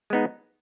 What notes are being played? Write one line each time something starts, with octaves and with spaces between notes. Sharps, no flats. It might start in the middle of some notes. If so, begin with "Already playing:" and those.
G#3 B3 D#4